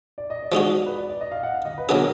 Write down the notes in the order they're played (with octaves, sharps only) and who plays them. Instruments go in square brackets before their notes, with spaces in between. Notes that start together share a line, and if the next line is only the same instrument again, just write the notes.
[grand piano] D5
D#5
D5
[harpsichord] F3 G#3 D#4 F#4
[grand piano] B4
D5
D5
D#5
F5
F#5
F5
D#5
B4
[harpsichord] B2 F#3 B3 D4 G#4 [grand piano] A#4